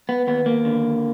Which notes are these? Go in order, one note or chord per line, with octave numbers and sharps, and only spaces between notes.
B3
D#2 B3
A#3
D3